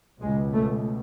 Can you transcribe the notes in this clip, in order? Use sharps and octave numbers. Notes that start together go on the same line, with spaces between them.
C#2 B2 G#3
A3